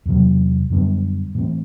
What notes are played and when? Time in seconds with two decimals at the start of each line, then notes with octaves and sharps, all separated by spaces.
0.06 E2 C3 F#3
0.70 F#2 D3 G3 B3
1.35 A2 E3 A3 C4